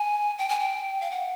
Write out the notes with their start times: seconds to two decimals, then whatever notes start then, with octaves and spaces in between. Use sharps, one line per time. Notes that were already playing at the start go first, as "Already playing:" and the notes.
Already playing: G#5
0.38 G5
0.49 G#5
0.60 G5
1.01 F5
1.11 F#5